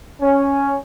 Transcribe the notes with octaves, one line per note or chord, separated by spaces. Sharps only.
C#4